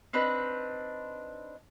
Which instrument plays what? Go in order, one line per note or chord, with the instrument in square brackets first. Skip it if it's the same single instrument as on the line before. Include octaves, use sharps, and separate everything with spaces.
[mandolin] C4 D4 D#4 B4